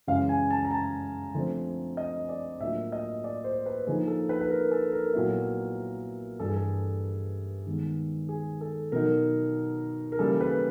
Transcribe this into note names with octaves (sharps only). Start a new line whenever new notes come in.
F#2 C#3 E3 G#3 F5
G#5
A5
A#5
A5
D3 F3 A3 C4
D#5
D5
A2 F#3 A#3 D4 F4 E5
D#5
D5
C5
B4
D3 F3 A#3 D#4 G#4
A4
B4
B4
A#4
A4
A#4
A#2 F#3 B3 E4
G2 E3 G3 A4
G#4
A4
D#3 G#3 B3
G#4
A4
B2 F#3 B3 D#4 A#4
A#4
C#3 E3 G3 A#3 A4
B4